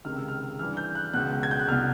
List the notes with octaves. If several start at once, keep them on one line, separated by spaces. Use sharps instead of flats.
C#2 C3 D#3 F6
E6
F6
G2 E3 F6
G6
F#6
C#2 B2 F#6
G#6
G6
F#6
C2 B2 F6